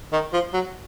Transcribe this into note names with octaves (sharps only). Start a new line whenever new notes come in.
D#3
F3
F#3